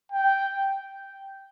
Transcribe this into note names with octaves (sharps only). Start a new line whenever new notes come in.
G5